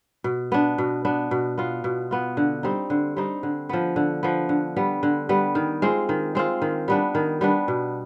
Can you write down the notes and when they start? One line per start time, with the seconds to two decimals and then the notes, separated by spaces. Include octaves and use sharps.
0.24 B2
0.52 B3 D4
0.78 B2
1.05 B3 D4
1.31 B2
1.58 B3 F4
1.84 B2
2.11 B3 F4
2.37 D3
2.63 G3 C4 D#4
2.90 D3
3.17 G3 C4 D#4
3.43 D3
3.69 F3 B3
3.96 D3
4.23 F3 B3
4.49 D3
4.76 G3 B3
5.03 D3
5.29 G3 B3
5.55 D#3
5.82 G#3 C4 F4
6.09 D#3
6.35 G#3 C4 F4
6.62 D#3
6.88 G3 B3 D4
7.15 D#3
7.41 G3 B3 D4
7.68 B2